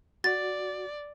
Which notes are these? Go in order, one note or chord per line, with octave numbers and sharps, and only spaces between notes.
F#4 D5 A6